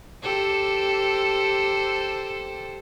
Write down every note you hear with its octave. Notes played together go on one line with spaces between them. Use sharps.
G4 A4 C5